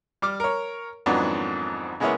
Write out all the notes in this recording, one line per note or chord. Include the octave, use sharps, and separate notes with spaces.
G3 D6 F6
A#4 C#5
F2 G#2 D#3 F#3 B3 D4
C#3 G#3 A#3 B3 E4 C#5